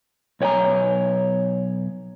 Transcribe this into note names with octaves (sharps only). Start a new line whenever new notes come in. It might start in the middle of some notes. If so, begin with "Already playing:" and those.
B1 C#5 G5 G#5 A#5